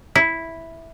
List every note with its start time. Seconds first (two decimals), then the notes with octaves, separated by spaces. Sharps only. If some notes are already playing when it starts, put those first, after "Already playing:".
0.15 E4